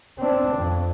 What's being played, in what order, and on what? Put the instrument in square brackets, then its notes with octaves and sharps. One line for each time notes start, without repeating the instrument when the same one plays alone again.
[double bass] C4 D4
F2